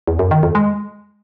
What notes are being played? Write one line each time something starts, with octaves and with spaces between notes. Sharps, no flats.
E2
F#2
D#3
F2
G#3